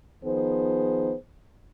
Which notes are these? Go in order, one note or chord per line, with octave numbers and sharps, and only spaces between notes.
D#3 F3 B3 D#4 G#4 C5